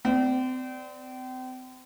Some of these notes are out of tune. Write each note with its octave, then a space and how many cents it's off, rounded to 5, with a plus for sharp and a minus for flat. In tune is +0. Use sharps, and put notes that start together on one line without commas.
C4 -35 D5 +0